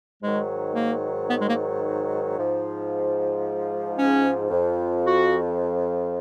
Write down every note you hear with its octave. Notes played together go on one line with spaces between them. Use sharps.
G#2 D#3 F#3 G#3
A#3
B3
G#3
A#3
G#2 F3
C#4
F2 F3
F#4